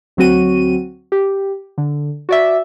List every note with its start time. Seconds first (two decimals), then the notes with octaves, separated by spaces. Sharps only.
0.17 D2 F#3 C4 F#4 D#7
1.12 G4
1.78 D3
2.29 F#4 D5 E5